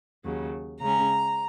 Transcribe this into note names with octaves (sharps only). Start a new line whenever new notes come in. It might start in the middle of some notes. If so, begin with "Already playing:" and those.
D#2 C#3 F#3
C#3 G#3 C#4 A#5